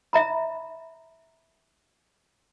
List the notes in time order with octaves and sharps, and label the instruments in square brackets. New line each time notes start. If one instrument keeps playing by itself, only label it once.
[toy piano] E5 A#5 B5